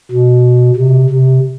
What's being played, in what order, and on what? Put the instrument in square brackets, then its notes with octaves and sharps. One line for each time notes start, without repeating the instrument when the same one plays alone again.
[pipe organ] B2
C3
C3